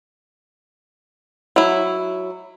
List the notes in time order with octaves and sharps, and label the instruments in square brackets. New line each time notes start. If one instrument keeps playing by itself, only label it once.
[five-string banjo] F#3 E4